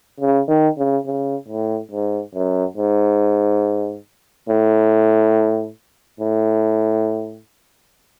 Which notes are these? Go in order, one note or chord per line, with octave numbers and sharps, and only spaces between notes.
C#3
D#3
C#3
C#3
A2
G#2
F#2
G#2
A2
A2